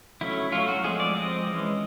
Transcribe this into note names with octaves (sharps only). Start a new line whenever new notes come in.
F#3 A3 C#4 E4
F#3 A3 C#4 F4
F#4
F3 G#3 C4 G#4
D5
F3 G#3 C4 D#5
E3 G#3 C#4